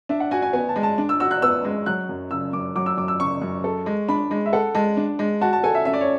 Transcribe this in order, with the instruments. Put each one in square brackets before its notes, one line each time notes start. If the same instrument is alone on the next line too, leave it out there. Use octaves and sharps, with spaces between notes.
[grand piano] D4 [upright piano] E5
[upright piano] F#5
[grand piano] F#4 [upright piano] G#5
[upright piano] G#5
[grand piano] B3 [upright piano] G#5
[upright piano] A5
[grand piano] G#3
[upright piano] A5
[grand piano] D4
[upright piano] E6
[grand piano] F#4 [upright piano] E6
[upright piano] F#6
[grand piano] B3 [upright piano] E6
[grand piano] G#3
[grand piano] F#3 [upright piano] F#6
[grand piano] F#2
[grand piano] C#3 [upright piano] E6
[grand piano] F#2 [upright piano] D6
[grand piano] F#3 [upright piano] D6
[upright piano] E6
[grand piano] F#2 [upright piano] D6
[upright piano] E6
[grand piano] C#3 [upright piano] C#6
[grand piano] F#2
A4
G#3
[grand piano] D4 [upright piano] B5
[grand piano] G#3
[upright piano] E5
[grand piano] A4 [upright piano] F#5
[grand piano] G#3 [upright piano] A5
[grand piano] D4
G#3
[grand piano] F#4 [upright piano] A5
[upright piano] A5
[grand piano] A4 [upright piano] G#5
[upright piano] E5
[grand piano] C#4 [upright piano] E5
[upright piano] D5
C#5